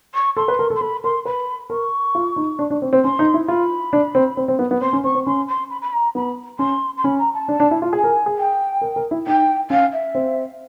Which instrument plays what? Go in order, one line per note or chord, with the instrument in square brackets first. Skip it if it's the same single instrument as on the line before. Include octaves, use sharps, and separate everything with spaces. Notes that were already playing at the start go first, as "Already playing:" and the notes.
[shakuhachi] C#6
[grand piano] A4 [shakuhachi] C6
[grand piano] B4
A#4
A4
[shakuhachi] C6
[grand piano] A4 [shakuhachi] B5
[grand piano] A#4 [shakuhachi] C6
[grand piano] B4 [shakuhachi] B5
[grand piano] A#4 [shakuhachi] C#6
[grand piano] F4
D#4
D4
D4
C4
C4
[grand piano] C#4 [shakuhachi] C6
[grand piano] D#4
E4
[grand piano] F4 [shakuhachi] B5
[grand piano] D4
C4
C4
C4
B3
B3
[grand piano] C4 [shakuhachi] C6
[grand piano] C#4
[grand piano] C4 [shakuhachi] C#6
[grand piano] C4
[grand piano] C#4 [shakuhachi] C6
[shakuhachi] C6
B5
B5
A#5
[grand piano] B3 [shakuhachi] B5
[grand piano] C#4 [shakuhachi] C6
[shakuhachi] C6
[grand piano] C#4 [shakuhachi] B5
[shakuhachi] A#5
A5
[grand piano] D4
D4
E4
F4
[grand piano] G#4 [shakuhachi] G#5
[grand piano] A#4
G#4
[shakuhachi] G5
[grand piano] A#4
A#4
E4
[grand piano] D#4 [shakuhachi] G5
[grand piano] C#4 [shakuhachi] F5
[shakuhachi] E5
[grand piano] C4